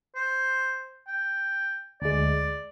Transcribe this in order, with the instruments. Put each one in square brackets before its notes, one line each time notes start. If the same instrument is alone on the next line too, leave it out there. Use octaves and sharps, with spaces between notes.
[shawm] C5
G5
[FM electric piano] D2 G#3 [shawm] D5